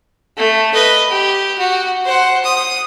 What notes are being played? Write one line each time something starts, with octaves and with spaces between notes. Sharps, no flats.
A3
B4 D#5
G4
F#4
C5 F#5
D#6